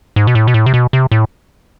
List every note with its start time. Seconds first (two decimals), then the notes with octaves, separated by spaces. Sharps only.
0.16 G#2
0.27 B2
0.35 A2
0.48 B2
0.54 A2
0.66 C3
0.74 B2
0.93 C3
1.12 A2